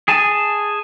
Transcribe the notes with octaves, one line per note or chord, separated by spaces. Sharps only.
G#4 G#5 A5